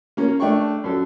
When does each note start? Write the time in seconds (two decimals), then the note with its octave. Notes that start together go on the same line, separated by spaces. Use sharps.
0.17 A#3 C#4
0.40 A3 D4 G5 C#6
0.84 F#2 A4